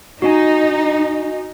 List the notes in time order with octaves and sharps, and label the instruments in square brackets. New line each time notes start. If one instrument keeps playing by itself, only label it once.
[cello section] D#4 [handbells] F#4 D#5 G#5